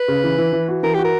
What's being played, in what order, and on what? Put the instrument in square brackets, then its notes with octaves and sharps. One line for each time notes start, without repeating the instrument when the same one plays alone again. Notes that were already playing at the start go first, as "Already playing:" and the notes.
Already playing: [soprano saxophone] B4
[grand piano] C#3
E3
E3
E3
F#4
[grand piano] E3 [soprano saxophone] A#4
[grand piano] F#4 [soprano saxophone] G4
[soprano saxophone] A#4